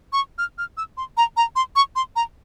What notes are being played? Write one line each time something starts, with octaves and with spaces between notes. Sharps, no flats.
C#6
F6
F6
E6
C6
A#5
A#5
C6
C#6
C6
A#5